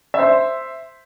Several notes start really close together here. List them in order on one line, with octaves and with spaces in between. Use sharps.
E5 C5 C6